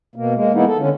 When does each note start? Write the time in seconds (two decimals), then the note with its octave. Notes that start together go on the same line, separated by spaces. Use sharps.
0.16 B2 A#3
0.35 G#3 A#3
0.54 E3 G#3 A#3 B3 D#4 E4
0.66 A4
0.78 D3 C#4